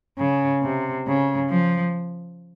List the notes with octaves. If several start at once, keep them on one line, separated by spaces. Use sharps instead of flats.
C#3
C3
C#3
F3